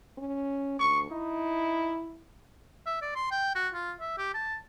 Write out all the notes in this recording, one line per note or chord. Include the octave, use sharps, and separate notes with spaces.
C#4
D2 C#6
D#4 E4
E5
D5
C6
G5
F#4
F4
E5
G4
A5